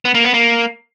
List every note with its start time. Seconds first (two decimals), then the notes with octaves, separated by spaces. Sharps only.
0.05 B3
0.15 A#3
0.24 B3
0.34 A#3